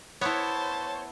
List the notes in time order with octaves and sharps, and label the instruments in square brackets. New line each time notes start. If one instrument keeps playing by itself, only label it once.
[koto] B3 E4 [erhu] C5 [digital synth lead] C#5 [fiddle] A5